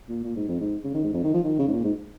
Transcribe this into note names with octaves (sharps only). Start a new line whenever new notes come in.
A#2
A#2
G#2
F2
G#2
C#3
D#3
G#2
F2
D#3
F3
D#3
C#3
G#2
A#2
G#2